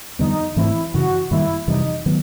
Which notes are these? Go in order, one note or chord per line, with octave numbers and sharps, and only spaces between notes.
F2 D3 G3 B3 D#4
G#2 E3 A3 C4 E4
F#2 C#3 E3 F#4
F#2 D#3 G3 A#3 E4
F2 C3 E3 G3 D#4
D#3 F#3 B3